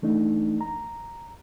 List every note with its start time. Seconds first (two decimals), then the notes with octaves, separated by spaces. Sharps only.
0.02 E3 A3 D4 D#4
0.61 A#5